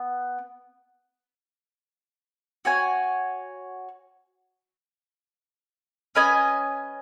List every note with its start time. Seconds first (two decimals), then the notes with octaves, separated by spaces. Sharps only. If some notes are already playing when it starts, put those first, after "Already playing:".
Already playing: B3
2.65 F#4 C#5 G#5
6.15 C#4 B4 D#5 G#5